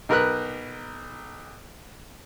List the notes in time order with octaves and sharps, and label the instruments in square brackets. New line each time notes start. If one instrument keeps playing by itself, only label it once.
[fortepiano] B1 A#4 B4 F#6